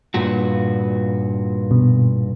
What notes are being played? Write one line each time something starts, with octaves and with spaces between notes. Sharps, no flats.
G2 A#2 F#4
B2